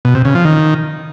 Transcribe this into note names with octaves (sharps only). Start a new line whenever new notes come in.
B2
C3
C#3
F3
D#3